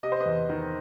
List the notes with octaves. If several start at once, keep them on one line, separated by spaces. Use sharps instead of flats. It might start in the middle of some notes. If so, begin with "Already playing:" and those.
C3 D#5
C5
B4 D#5
E2
D#3